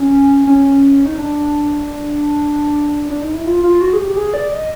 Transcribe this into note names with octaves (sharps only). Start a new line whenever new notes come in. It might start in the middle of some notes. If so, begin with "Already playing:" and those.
Already playing: C#4
C#4
D#4
D4
D4
D#4
E4
F4
F4
F#4
G#4
G4
G#4
D5
D#5